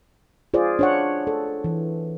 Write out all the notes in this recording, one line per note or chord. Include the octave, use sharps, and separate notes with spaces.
F4 G#4 C5 D5
D4 C#5 F#5
A4
E3